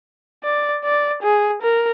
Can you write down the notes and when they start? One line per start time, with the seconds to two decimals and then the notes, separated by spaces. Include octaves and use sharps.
0.44 D5
0.84 D5
1.23 G#4
1.62 A#4